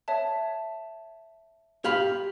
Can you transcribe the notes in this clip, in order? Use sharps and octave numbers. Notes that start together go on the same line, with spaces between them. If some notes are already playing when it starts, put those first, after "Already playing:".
C#5 E5 A5
G4 F5 B5